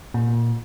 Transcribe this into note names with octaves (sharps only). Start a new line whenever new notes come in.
A#2